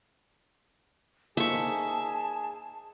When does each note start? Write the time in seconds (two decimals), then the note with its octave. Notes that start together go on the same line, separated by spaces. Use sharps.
1.37 A#3 D#4 G#4 C5 E5 A5 C#6